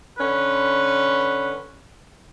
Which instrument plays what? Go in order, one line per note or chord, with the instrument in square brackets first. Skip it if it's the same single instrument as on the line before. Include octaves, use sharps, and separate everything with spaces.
[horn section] D3 C#4 B4